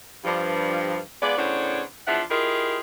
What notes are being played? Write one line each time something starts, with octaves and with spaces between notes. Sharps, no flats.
G2 F3
G#3 B3 F4 D5
A2 C#3 B3 D4 C5 C#5
E2 F3 D4 F4 E5 F#5
E4 F4 G4 G#4 A#4 D#5